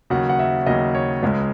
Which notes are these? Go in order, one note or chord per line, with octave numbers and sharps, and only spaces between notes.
D#2 C#3 F#3 F#5
F#5
E5
D#2 C#3 F#3 D#5
C#5
C#2 C#3 G#3